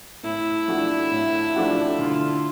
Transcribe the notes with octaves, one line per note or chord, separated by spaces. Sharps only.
A2 E4
F3 A3 D4 F#4
A2
F3 A3 D4 F#4
D3 F4